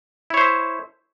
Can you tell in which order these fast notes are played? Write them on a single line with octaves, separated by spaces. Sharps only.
E4 C#5 C5 E5